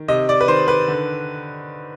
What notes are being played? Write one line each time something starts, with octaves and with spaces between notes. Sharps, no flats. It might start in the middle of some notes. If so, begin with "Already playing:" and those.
Already playing: D#3
C3 D#5
D5
B4
D#3 C5
B4
D3